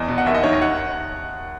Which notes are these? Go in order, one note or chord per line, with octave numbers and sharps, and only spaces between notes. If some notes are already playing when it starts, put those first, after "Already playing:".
Already playing: E2 D#5
B2
F#5
D#2 E5
D#5
D#3 C#5
D#5
F#5